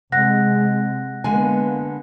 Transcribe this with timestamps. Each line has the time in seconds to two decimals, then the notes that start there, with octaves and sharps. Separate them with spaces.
0.12 C3 G#3 C4 F#5 F#6 A#6
1.24 D3 G#3 A#3 B3 G#5